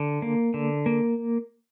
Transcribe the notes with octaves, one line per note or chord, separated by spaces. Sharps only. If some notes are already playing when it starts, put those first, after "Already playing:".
Already playing: D3
A#3
D3
A#3